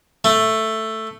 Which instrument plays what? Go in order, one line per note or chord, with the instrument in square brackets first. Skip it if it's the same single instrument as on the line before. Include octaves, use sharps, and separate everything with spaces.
[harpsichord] A3